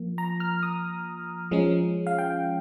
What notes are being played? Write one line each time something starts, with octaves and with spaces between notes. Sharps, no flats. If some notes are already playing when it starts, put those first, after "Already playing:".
Already playing: F3 A#3
A#5
F6
D#6
F3 G#3 C#4
F5
G5